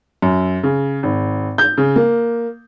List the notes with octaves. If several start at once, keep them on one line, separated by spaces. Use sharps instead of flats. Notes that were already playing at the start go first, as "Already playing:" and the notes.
F#2
C#3
G#1
G6
C#3
A#3